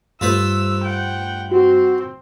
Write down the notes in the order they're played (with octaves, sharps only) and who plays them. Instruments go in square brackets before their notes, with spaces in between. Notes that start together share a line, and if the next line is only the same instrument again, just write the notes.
[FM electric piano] G2 G3 A3 [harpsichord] F4 B4 C5 [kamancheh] E6
[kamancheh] F#5 G5
[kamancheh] C4 [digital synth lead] F#4